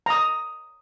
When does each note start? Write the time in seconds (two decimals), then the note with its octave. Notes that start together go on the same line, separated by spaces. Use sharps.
0.06 A#5 D#6